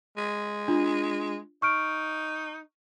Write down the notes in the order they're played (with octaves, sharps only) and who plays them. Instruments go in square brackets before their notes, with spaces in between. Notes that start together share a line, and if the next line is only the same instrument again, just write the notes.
[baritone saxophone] G#3
[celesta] D4 F4
[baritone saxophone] D#4 [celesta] C#6 F6 D7